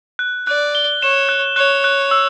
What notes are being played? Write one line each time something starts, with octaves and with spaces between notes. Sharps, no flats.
F#6
D5 F#6
G7
C#5 E7
F#6
C#5 F#6
F#6
E6